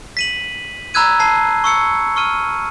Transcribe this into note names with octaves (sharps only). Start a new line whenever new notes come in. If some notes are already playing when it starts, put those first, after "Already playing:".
B6 D#7 F#7
A#5 B5 E6 F#6 G#6 D#7
A5 C7
C#6 E6 C#7
C#6 F6 D#7